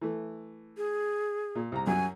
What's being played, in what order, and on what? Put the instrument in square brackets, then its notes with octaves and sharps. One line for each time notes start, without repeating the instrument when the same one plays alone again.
[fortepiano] E3 A3
[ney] G#4
[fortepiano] A#2
C2 A#5
[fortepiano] F#2 F#3 [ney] G#5